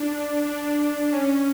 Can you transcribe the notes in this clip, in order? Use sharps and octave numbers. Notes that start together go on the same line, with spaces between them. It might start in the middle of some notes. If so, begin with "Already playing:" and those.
Already playing: D4
D4
C#4